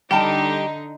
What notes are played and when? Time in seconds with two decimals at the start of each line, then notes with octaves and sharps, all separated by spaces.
0.11 D3 G3 D#4 G4 G5 A5